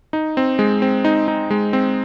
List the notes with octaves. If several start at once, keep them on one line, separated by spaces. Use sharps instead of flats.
D#4
C4
G#3
C4
D#4
D#4
G#3
C4